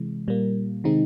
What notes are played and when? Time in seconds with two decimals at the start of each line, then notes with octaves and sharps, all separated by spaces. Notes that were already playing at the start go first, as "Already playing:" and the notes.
Already playing: C3 E3 G#3
0.28 A#2 G3 A#3
0.84 C3 D#3 G#3 C4 D#4